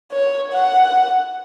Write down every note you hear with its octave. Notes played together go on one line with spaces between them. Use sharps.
C#5
F#5